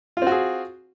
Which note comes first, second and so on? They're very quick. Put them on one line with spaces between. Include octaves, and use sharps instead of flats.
F4 C4 F#4 G#4